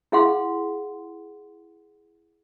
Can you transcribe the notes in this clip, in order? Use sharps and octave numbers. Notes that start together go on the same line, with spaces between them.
E4 G#4 F5 F#5 C6